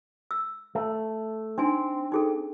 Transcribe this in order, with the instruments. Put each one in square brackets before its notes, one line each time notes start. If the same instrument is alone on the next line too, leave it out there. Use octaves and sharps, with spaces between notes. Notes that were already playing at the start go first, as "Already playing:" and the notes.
[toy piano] E6
[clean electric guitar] A3
[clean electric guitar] C4 [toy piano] D4 D#4 G#5
[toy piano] D#4 G#4 A4